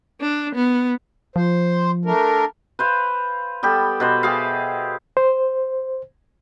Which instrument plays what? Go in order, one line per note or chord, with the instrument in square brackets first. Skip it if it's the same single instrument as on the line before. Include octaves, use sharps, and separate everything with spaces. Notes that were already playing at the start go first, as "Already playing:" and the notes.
[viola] D4
B3
[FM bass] F3 [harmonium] C5
[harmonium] A3 D4 A#4
[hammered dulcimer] B4 C5 F5
G3 B3 G4 A4
B2 B4 C5
G4 G#4 E5 F5
[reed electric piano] C5